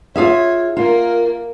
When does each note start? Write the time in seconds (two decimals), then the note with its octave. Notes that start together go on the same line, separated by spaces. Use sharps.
0.16 F4 G#4 C#5 E5
0.77 A#3 F4 A#4